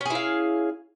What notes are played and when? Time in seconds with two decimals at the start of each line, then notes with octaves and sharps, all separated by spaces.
0.01 C#4
0.05 G#4
0.10 E4
0.15 F5